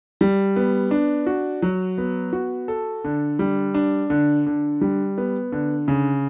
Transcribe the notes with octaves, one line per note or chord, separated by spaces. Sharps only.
G3
B3
D4
F#4
F#3
B3
F#4
A4
D3
G3
D4
D3
D3
G3
B3
D3
C#3